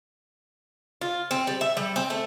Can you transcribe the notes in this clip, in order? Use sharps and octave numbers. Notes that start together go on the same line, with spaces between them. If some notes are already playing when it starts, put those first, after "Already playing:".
F4
C4
G3
E5
G3
C4
A3